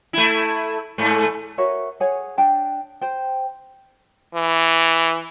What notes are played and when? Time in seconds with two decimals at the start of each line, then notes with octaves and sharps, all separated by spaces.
0.13 A3 E4
0.98 G#2 A3
1.58 F#4 A#4 C#5 E5
2.00 G#4 C#5 F#5 G#5
2.38 D4 G5 A5
3.01 C5 G5
4.34 E3